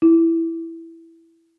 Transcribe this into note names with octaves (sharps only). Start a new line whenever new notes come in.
E4